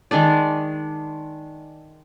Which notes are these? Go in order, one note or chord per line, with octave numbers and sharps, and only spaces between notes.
D#3 G#3 D4 D5